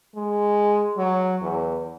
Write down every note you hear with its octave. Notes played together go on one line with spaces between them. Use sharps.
G#3
F#3
E2